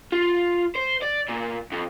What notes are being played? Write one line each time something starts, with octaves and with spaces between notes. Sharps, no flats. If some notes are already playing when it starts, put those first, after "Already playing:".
F4
C5
D5
A#2
F2